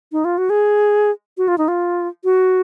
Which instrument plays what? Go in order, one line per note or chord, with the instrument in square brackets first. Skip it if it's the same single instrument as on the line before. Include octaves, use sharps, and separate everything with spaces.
[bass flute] D#4
F4
F#4
G#4
F#4
F4
D#4
F4
F#4